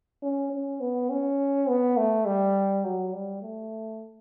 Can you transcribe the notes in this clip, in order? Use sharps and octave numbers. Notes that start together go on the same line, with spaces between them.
C#4
C#4
B3
C#4
B3
A3
G3
F#3
G3
A3